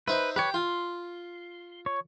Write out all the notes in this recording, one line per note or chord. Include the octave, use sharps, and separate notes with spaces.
D#4 B4 C5 E5
G4 B4 C#5
F4 C6
C#5